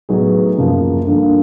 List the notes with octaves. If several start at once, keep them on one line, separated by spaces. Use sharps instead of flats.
A2 F#3 B3 D#4 G#4
F#2 C#3 F3 A#3
G2 D3 F3 A#3 D#4